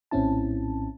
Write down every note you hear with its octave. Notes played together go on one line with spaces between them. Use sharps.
A#1 A2 C4 C#4 E4 A5